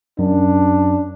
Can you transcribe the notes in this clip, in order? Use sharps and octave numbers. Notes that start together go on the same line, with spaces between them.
F#2 D4